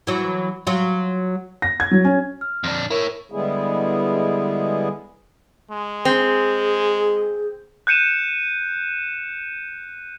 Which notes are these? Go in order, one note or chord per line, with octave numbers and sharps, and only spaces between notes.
E3 F#3
F#3 F4
A#6
G#6
F#3
C#4
F6
F2 D4
E4 A#4 C#5
D3 G3 G#3 B3 E4 G#4
G#3
C4 G#4
F#6 G6 C#7 D#7 E7